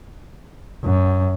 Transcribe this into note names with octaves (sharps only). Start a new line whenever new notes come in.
F#2